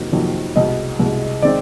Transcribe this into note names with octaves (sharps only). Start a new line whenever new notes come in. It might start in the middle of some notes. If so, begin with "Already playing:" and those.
Already playing: F2 C3 D#3 F#3 A#3
F2 C3 D#3 F#3 A#3
C2 B2 G#3 D#5
C2 B2 G#3
D#3 G#3 C4 D5